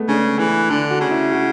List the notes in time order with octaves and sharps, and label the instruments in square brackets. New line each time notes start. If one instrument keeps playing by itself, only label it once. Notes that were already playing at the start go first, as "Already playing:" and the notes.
Already playing: [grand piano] G#3 A3 B3
[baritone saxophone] C#3 [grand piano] D4
[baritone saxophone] E3
[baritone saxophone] D3 [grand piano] D4
[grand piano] F#4
[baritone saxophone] C#3
[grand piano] E4
F#4